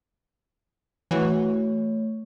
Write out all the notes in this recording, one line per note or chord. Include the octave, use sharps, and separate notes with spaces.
E3 A3 F#4 C#5